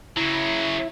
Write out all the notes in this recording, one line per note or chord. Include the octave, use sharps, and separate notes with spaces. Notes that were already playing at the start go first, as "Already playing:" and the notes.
C#3 F#3 E4